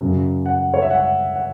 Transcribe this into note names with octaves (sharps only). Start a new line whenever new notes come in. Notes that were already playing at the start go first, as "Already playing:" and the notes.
F#2 C#3 F#3
F#5
C#5
E5
F#5
F#5